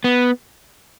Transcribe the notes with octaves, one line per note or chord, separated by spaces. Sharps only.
B3